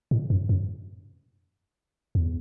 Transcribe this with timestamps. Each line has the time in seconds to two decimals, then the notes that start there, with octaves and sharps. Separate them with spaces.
0.11 A2
0.30 F#2
0.49 F#2
2.15 E2